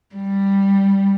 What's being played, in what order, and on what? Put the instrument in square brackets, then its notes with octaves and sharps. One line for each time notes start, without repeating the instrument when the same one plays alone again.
[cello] G3